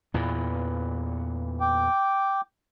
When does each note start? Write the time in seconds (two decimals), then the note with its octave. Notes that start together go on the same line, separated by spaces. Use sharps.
0.14 E2 A#2 E3
1.61 G5 D6